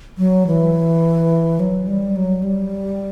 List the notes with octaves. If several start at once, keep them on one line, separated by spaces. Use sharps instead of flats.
F#3
E3
F#3
G3
F#3
G3